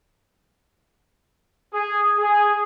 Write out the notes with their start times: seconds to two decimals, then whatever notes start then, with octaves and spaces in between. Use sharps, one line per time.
1.73 G#4
2.19 G#4